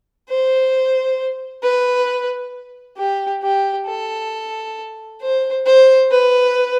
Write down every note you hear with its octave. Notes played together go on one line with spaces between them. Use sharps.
C5
B4
G4
G4
A4
C5
C5
B4